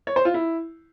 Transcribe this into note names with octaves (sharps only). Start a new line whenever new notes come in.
C#5
C5
F4
E4